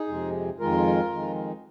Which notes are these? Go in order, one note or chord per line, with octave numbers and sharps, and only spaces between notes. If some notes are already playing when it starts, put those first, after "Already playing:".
Already playing: D#4 G#4
F2 C3 G#3
F2 D#3 G#3 F4 A#4
F2 D#3 G#3